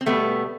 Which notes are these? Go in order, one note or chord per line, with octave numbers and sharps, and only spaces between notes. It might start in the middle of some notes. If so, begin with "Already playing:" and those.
C4
B2 G3 A3 B3